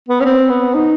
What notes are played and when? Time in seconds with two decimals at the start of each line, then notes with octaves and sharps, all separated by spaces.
0.09 B3
0.21 C#4
0.25 C4
0.50 B3
0.74 D#4